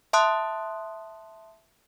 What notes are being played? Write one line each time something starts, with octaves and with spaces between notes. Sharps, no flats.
E5 A5 C6 D#6 F#6